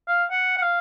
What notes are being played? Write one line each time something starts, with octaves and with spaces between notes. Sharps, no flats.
F5
F#5
F#5
F5